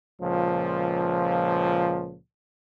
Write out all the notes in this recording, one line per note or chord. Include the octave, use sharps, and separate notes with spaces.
C#2 A#2 F3